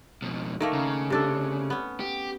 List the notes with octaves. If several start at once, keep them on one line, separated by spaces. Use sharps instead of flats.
F2 B2
D#3 A3 A#3
C#3
C3 D4 A4
B3 C#4
G4